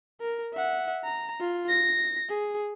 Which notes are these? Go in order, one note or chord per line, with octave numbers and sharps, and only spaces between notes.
A#4
E5 F#5
A#5
F4
A#6
G#4